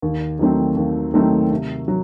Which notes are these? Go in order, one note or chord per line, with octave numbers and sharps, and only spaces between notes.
D#2
D#3 F#3 A3 C4
D#2
D#3 F#3 A3 C4
C3
F#3